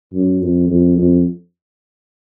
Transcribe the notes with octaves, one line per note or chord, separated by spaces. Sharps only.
F#2
F2
F2
F2